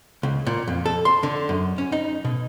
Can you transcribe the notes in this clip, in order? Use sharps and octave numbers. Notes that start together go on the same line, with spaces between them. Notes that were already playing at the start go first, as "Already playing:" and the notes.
C#2
A#2
F2
A4
C6
D3
F#2
C#4
D#4
B2